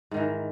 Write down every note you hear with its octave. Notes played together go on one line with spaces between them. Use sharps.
G#2 D#3 E3